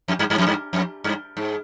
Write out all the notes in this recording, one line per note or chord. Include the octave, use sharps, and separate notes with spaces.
F2
G2
G2
F2
G2
F2
G2
G#2